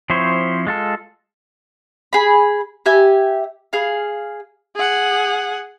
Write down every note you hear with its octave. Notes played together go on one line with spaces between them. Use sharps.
F3 C4 E4 C5 C#5
G#3 F4 A4
G#4 B5
G4 E5 G#5
G#4 F5
G#4 F#5